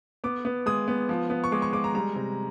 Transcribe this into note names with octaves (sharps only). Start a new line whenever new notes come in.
B3 D6
B3
G#3 D#6
B3
F3
B3
C#6
G#3 D6
C#6
G#3 D6
A#5
G3 A#5
C3